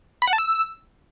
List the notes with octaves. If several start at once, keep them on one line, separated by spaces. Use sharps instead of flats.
B5
F#5
A5
E6